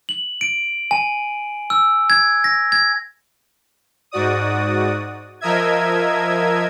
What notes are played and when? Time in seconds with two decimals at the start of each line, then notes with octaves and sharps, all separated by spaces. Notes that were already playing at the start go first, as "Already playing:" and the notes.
0.09 F#7
0.41 D7
0.91 G#5
1.70 E6
2.10 G#6
2.44 A#6
2.72 G#6
4.11 G#2 F#4 D5 D#6
5.41 F3 A#4 D#5 E5 G#6